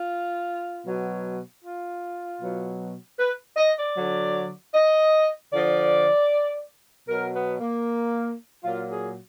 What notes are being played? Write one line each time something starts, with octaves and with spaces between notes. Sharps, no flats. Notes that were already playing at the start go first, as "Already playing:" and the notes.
Already playing: F4
B2 F#3
F4
B2 F#3
B4
D#5
D5
D3 F#3
D#5
D3 F3 D5
B2 F#3 A#4
B3
A#3
A#2 F#3 F4
G#4